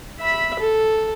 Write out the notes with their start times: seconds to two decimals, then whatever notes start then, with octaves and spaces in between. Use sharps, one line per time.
0.19 E5 B5
0.59 A4